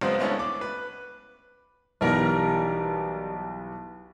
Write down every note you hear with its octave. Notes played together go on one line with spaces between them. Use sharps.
F#1 C#3 G#3 B3 C4 C5
G#3 A3 B3 C#4 D4 E4
D6
B4
B1 E3 G3 B3 A#4